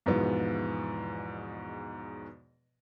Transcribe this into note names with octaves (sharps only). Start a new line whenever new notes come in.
E2 G#2 B2 E3 F3 B3